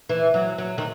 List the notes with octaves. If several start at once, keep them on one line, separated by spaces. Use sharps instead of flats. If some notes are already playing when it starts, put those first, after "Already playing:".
E3
F#3
F#3
D#3